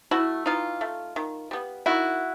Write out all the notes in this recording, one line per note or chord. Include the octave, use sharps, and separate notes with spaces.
A3 E4 F#4
E3 D#4 F4
A3
D#3
G3 B3
D#3 E4 F#4